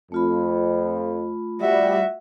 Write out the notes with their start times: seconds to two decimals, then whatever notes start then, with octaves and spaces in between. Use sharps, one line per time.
0.12 F2 A3 F4 B5
1.61 G3 F#4 E5